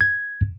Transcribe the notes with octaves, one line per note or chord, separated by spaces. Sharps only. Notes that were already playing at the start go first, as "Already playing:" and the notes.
G#6